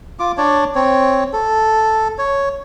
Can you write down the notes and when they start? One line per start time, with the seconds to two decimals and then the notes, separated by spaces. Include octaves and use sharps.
0.19 F4 D6
0.37 D4 C#5 D5
0.75 C4 C#5
1.33 A4
2.18 C#5